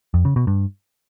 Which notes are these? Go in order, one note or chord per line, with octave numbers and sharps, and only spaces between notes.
F2
C#3
B2
G2